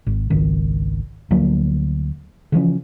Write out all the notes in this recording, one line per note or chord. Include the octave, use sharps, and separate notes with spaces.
G#1
G#1 C#2 D#3
D2 F3 F#3 A#3
C#3 E3 F3 C#4